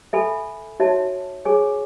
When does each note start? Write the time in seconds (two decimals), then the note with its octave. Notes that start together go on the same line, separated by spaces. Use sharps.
0.13 A4 E5 G#5 B5
0.80 D#4 F#4 C#5 E5 A5
1.45 G#4 C#5 G#5 C#6